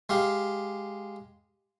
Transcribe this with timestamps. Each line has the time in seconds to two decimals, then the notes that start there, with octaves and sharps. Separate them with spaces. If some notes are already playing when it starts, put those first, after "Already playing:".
0.09 G#3 G4 F5